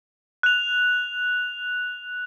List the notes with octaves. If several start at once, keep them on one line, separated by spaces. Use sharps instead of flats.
F#6 F7